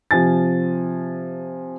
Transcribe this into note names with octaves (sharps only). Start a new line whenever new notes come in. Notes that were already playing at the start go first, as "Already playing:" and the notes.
C3 F3 G#5 A6